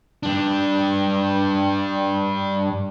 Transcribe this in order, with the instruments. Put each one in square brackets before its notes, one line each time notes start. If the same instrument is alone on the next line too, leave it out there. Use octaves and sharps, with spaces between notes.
[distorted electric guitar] G2 D4